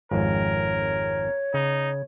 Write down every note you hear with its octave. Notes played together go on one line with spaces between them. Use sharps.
G#1 F2 G#2 A#4 C#5
C#3 D#4